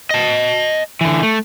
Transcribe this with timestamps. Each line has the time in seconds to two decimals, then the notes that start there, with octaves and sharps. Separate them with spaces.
0.11 D#5 A5
1.01 D3 E3
1.23 A3